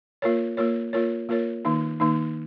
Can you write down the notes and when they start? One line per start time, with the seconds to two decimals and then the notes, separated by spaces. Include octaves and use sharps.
0.22 A#3 F4 A#4 C#5
0.57 A#3 F4 A#4 C#5
0.93 A#3 F4 A#4 C#5
1.29 A#3 F4 A#4 C#5
1.65 D#3 A#3 D#4
2.00 D#3 A#3 D#4